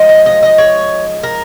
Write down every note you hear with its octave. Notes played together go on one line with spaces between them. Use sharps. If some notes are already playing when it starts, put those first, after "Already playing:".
Already playing: F3 G#3 D#4
D#5
D#5
D#5
C#5
A#4